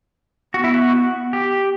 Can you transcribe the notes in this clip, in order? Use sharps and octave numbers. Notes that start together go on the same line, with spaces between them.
B3 F#4
E4
F#4
G4